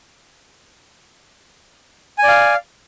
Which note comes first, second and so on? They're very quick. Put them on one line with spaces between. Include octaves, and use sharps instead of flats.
G#5 D5 F5